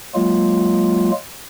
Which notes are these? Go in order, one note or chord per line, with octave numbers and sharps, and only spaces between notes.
F#3 G#3 A#3 F4